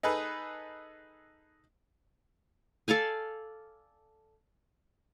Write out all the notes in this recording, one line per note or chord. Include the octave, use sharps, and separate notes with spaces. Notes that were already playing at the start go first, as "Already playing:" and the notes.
D#4 G#4 A4 B4
A4 D5 F5 G#5